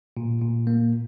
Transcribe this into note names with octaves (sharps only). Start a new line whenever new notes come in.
A#2
A#2
A#3